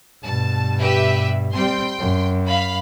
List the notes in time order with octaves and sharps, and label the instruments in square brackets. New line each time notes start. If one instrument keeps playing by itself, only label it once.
[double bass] G2 B2 [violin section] A5
[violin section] G4 B4 E5
[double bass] G3 C4 [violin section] G5 C6
[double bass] F#2
[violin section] F5 B5